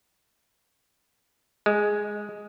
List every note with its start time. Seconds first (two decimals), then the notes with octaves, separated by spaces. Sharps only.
1.66 G#3